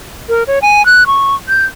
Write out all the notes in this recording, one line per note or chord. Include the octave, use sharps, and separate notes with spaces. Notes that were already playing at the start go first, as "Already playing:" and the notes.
A#4
C#5
G#5
F#6
C#6
G6